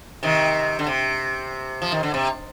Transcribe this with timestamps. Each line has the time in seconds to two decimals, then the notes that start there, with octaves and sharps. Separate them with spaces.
0.23 C3 D#3
0.79 D3
0.87 C3
1.82 F3
1.92 D#3
2.03 D3
2.14 C3